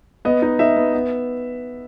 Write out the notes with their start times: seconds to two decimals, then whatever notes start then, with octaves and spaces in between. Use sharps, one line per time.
0.25 B3 D#5
0.42 D#4
0.59 D#4 E5
0.76 B3
0.94 B3